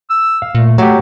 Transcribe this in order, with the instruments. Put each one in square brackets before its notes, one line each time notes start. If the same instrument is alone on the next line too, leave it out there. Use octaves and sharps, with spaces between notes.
[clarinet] E6
[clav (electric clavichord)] F5
[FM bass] A#2 [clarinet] A3
[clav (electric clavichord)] F#3 G4 [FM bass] A3 [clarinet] F#5